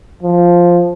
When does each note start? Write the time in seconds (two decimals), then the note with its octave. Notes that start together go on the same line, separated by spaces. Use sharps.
0.23 F3